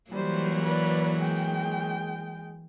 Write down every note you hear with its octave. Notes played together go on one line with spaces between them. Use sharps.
E3 F#3 G3 A#3 C5
B4 D5
G#3 G5